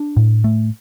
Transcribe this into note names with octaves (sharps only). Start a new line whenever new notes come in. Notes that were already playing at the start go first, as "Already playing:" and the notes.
Already playing: D4
A2
A3